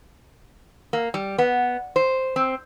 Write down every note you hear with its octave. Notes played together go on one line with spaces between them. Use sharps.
A#3
G3
B3
C5
C4